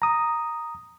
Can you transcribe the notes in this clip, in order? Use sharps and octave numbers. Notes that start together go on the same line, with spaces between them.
A#5 D#6